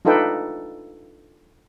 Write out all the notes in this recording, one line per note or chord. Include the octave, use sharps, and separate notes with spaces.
D4 D#4 F4 A4 B4 G5